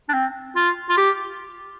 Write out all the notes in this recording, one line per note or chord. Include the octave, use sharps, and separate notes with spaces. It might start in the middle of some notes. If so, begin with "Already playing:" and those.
D4
C4
F4
F4
G4